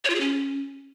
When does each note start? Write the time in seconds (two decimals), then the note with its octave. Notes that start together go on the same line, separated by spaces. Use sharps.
0.04 C#5
0.10 F4
0.15 G#4
0.20 C#4